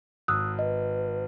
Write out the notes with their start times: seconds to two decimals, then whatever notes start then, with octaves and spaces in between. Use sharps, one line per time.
0.28 G#1 D#6 E6 F#6
0.59 B4 D#5